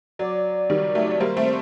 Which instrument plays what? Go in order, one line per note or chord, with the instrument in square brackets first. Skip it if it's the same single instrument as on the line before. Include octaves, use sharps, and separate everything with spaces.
[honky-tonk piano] F#3 [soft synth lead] D5
[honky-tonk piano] D#3 G3
F#3 A3
[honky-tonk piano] G3 A#3 [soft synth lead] C5
[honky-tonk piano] A3 C4
[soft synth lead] C5